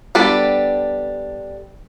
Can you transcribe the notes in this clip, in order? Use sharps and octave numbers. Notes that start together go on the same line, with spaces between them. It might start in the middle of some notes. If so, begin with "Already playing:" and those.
G3 B3 D4 A4